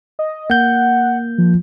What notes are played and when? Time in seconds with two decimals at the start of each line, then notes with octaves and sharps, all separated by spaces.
0.19 D#5
0.50 A#3 F#5 G6
1.38 F3